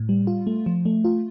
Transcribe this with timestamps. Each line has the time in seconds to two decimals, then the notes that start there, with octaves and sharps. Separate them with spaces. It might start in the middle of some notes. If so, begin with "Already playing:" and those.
Already playing: A2
0.09 G3
0.27 F4
0.47 A3
0.66 F3
0.85 A3
1.04 F4